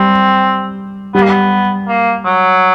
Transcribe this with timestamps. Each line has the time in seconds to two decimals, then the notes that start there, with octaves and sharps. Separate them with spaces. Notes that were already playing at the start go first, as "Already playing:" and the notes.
Already playing: G3 C4
1.14 G3 B3
1.22 A#3
1.29 B3
1.88 A#3
2.25 F#3